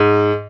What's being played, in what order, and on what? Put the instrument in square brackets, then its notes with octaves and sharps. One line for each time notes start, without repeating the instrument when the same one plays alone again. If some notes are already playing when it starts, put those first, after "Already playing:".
Already playing: [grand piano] G#2